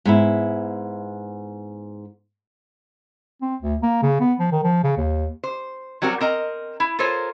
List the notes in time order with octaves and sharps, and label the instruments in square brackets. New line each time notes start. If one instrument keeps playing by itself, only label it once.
[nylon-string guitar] G#2 B3 E4
[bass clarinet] C4
D2
A#3
C#3
B3
F3
D#3
F3
C#3
D#2
[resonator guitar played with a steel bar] C5
F#3 G3 C4 F#4 A#4
C4 A#4 D#5 A#5
E4
F4 A4 A#4 C5 C#5